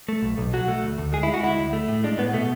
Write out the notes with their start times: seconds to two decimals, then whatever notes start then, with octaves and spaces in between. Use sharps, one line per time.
0.09 A3
0.23 B1
0.38 B1
0.53 F#3 F#4
0.68 A3
0.83 D2
0.98 D2
1.12 G#3 G#4
1.23 E4
1.28 G#3
1.34 F#4
1.43 D2 E4
1.59 D2
1.73 A3
1.88 A2
2.04 G#3 D4
2.18 A2 B3
2.33 B2 A3